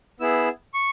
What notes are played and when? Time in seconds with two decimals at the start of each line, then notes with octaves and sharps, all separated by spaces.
0.20 B3 E4 G#4 E6
0.74 C#6